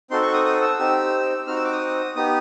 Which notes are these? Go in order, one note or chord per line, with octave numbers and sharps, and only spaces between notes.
C4 D#4 F#4 A4 C6
C#6
D#6
D#6
E6
C4 D#4 G4 E6
C4 D#4 F#4 F6
E6
D6
D#6
B3 D#4 G4 D#6